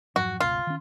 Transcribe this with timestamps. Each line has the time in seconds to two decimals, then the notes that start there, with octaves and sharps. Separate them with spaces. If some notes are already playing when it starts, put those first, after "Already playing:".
0.16 F2 G#2 F#3 F#4
0.40 G1 C#2 B2 F4
0.67 D#3 C#4